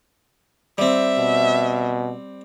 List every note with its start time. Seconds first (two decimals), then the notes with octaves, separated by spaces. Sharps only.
0.78 G3 C4 E5
1.18 B2